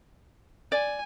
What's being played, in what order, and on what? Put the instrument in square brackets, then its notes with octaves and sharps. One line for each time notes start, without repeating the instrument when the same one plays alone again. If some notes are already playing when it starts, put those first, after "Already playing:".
[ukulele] D5 [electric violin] G#5